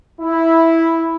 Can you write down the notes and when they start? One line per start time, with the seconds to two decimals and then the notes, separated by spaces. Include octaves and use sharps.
0.21 E4